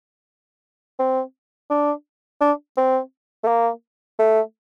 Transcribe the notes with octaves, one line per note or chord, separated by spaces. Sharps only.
C4
D4
D4
C4
A3
A#3
A3